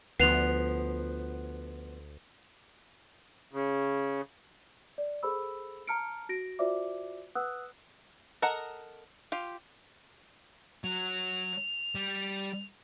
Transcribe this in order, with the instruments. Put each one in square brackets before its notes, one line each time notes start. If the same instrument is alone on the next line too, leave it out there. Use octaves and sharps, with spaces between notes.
[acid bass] D2 [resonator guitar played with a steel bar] F3 B3 [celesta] C7 F7
[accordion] C#3
[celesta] D5
G#4 A4 C5 B5 E6
A5 A#5 F6 C#7 D7
F#4 A#6 D7
F4 F#4 C5 D5 E5 D6
B4 F#5 D#6 E6 F#6
[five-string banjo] A4 A#4 D#5 F#5
F4 G4
[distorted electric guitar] F#3 [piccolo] F7
[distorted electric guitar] G3